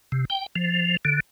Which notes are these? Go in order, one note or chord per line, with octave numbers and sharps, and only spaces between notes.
C3
G5
F3
D3